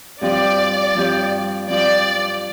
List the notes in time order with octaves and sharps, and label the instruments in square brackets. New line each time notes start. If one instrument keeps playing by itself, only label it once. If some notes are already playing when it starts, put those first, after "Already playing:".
[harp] G2 F3 C4 G4 [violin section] D5
[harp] G2 F3 C4 G4
[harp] G2 F3 C4 [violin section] D5